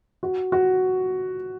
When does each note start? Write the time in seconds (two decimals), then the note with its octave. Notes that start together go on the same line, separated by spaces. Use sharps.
0.23 F#4
0.52 F#4